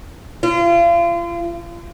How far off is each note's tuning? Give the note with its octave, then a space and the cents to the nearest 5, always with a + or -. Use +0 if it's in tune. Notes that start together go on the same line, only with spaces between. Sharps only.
F4 -35